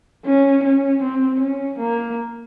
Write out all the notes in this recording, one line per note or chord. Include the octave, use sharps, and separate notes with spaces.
C#4
C#4
C4
C#4
A#3